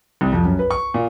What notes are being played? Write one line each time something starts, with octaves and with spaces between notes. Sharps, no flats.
C2
F2
F#2
B4
C#6
A#2